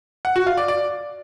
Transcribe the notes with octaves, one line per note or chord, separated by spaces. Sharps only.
F#5
F#4
F5
D5
D5